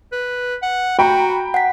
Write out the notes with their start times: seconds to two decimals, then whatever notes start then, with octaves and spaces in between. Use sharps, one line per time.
0.12 B4
0.62 F#5
0.99 F#4 G5 A#5 B5
1.54 F#5 B6